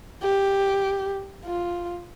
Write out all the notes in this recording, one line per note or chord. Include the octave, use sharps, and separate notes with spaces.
G4
F4